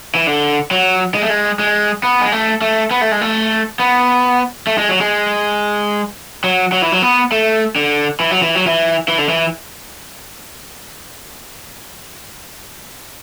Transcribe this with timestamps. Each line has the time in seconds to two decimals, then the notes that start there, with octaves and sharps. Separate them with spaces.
0.15 E3
0.27 D3
0.71 F#3
1.15 G#3
1.22 A3
1.30 G#3
1.59 G#3
2.03 B3
2.21 G#3
2.32 A3
2.62 A3
2.91 B3
3.01 A3
3.12 G#3
3.21 A3
3.79 B3
4.67 A3
4.78 G#3
4.89 F#3
5.01 G#3
6.44 F#3
6.72 F#3
6.82 E3
6.92 F#3
7.02 B3
7.32 A3
7.76 D3
8.20 E3
8.31 F#3
8.42 E3
8.55 F#3
8.67 E3
9.08 E3
9.18 D3
9.29 E3